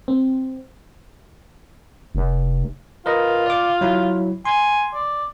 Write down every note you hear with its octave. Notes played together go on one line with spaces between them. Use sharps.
C4
F1
F4 A#4 B4 D#5
D5 D6
F#3 E4
G#5 C6
D5